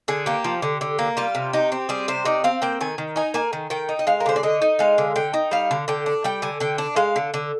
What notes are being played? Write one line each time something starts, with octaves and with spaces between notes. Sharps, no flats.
D3 G#4
A#3 G4
F3
D3
D3
A#3
G3 F4
C3
D#4 G4
C4
G3 G#4
C3 C5
D#4 D5
C4 F5
A#3 G5
D#3 G#5
D#3
D#4 G#5
A#3 G#5
D#3
D#3 G5
D#4
D#5
G#3 F5
A#4
D3 C5
D5
D3 D#5
D#4
G#3 F5
D3
D3 G5
D#4
G3 F5
D3
D3 G5
D4
G3 G5
D3 G#5
D3 G5
D4
G#3 F5
D3
D3